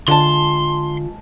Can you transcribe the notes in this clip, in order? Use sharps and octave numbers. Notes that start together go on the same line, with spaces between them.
D3 G#3 F4 A5 C6